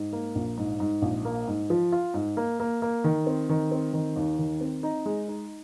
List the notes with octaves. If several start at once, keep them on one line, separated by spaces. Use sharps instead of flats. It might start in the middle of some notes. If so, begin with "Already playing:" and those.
Already playing: G#2
A#3
A#1
G#2
G#2
A#1
A#3
G#2
F3
F4
G#2
A#3
A#3
A#3
D#3
C4
D#3
C4
D#3
D#2
D#3
C4
D#4
G#3
D#4